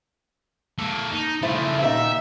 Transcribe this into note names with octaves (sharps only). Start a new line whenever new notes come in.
A#3 A4
D#4
C#3 F3 A3 E4 C5
A#2 D#3 D#4 E5